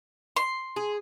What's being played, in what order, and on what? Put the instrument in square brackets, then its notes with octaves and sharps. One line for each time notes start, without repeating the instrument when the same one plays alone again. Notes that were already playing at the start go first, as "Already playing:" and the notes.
[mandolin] C6
[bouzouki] G#4